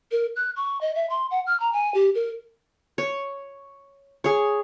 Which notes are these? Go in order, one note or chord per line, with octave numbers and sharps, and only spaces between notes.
A#4
F#6
C#6
D#5
E5
C6
F#5
F6
A#5
G#5
G4
A#4
C#5
G#4 C#5